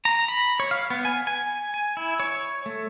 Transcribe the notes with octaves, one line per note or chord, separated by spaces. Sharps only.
A#5
B5
C#5
F5
B3
G#5
G#5
G#5
E4
C#5
A3